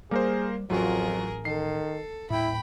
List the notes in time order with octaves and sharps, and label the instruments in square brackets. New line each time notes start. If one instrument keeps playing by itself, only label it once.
[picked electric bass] G3 [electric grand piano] A#3 A#4 C5 [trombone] G#4
[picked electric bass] A1 [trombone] F2 [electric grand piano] F#3 F4 F#4 [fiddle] G#4 A#4
[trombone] D#3 [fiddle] A4 [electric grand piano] C7
[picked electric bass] D#1 A2 [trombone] E4 [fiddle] G5 B5